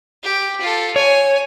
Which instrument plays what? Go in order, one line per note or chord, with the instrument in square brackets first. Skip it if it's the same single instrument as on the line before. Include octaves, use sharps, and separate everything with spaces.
[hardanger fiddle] G4
F4 A4
[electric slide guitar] C#5 [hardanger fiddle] G#5